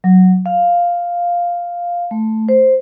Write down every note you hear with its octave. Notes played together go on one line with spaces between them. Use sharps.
F#3
F5
A3
C5